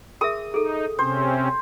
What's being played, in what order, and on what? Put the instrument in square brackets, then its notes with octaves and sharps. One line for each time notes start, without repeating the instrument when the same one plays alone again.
[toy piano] G#4 A#4 E5 [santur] D#6
[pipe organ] D#4 [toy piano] G#4 A4
[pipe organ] C3 C4 C#4 [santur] C5